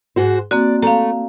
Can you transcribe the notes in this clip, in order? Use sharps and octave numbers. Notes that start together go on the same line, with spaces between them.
G#2 F#4 C5
A#3 C4 F#4 D5
A3 F5 A#5